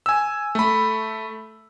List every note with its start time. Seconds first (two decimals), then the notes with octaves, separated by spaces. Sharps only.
0.06 G#5 E6
0.55 A3 B5